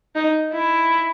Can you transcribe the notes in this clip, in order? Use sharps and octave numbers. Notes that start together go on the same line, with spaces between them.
D#4
E4